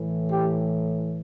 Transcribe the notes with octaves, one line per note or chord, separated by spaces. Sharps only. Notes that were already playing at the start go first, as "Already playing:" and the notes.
Already playing: A2 E3
G4